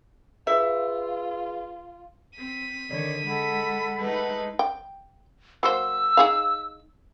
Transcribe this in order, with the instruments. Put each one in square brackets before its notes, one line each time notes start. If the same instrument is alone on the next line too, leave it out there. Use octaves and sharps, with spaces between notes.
[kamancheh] F4 [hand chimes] G#4 B4 [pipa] E5
[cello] C4 [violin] B6 D#7
[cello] D3 D#3 [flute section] C#5 D5
[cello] G#3 [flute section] A4 F#5 B5
[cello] G#3 D#4 [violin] A3 B4
[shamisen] G5
[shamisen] F#3 A#3 C5 [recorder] E6
[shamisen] D#4 G#4 F5